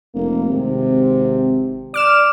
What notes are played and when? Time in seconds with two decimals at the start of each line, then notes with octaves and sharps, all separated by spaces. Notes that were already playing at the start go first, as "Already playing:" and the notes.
0.15 F1 A#3
0.49 G#1 C3
1.94 D5 D6 F6 E7